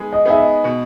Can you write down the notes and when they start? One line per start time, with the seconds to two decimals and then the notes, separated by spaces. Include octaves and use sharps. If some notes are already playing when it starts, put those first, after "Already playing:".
Already playing: G#3 B3 D#4
0.13 D#5
0.26 B3 D#4 G#4 E5
0.38 D#5
0.64 B2